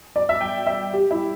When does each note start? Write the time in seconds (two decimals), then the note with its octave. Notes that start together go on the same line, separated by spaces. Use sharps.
0.16 D5
0.29 E5
0.41 G5
0.67 E5
0.93 G4
1.11 E4